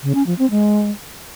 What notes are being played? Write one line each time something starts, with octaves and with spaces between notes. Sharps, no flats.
C#3
C#4
F3
C4
G#3